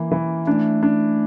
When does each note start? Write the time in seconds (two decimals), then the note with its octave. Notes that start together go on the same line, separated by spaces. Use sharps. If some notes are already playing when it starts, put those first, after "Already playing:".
Already playing: E3 A#3
0.12 E3
0.47 A3 D4
0.83 D4